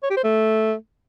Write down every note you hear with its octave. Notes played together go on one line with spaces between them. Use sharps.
C#5
G4
C5
A3